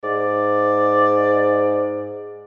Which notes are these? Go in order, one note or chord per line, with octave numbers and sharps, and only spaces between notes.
G#2 D5